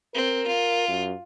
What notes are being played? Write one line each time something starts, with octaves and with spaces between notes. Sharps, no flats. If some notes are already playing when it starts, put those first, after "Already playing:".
C4 A#4
F4
F#2